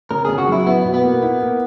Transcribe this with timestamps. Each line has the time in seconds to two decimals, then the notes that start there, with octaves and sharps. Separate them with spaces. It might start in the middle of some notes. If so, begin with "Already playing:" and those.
0.11 C#3 A#4
0.25 C#3 G#4
0.38 F#4
0.47 F#3 E4
0.66 B3 E4
0.85 B2
0.94 B3
1.03 A#3
1.22 E4
1.41 A#3